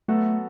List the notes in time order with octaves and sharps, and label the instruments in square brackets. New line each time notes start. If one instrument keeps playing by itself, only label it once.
[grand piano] F#3 B3 F#4 A4 [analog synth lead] A3